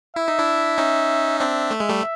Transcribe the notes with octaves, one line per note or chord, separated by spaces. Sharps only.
E4 E5
D#4
D4 E4
C#4 D#4
C4 D4 E5
A3
G#3
G3 A3